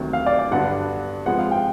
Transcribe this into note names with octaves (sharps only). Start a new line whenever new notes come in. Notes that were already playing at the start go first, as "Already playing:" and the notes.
Already playing: D2 C3 D#3 F#3
F5
D5
D5
G2 D3 F#3 B3 D4 F#5
C3 F3 G#3 B3 F#5
F5
G5